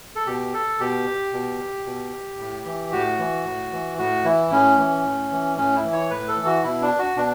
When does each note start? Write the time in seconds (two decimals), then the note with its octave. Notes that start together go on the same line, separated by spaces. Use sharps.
0.16 A4
0.27 B2 G4
0.54 A4
0.80 B2 G4
1.33 B2
1.86 B2
2.39 A2
2.65 E3
2.92 A2 F#4
3.18 E3
3.46 A2
3.72 E3
3.98 A2 F#4
4.24 E3 E4
4.51 A2 C#4
4.78 E3
5.05 A2
5.31 E3
5.57 A2 C#4
5.76 E4
5.84 E3
5.93 C#5
6.10 A2 B4
6.28 A4
6.37 E3
6.46 F#4
6.64 B2 E4
6.82 D4
6.99 F#4
7.17 B2 D4